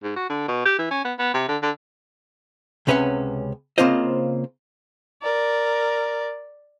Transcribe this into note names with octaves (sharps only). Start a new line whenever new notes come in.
G#2
F#4
D3
B2
G4
E3
C#4
B3
B3
C3
D3
D3
C#2 C3 C#4 B4 E5 F#5
C#3 A#3 C4 F4 C5 D#5
A#4 D5